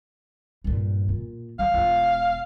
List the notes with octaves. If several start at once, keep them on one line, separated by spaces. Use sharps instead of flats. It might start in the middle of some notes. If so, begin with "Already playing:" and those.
G2 A#2
A#2
G3 F5
E1 F4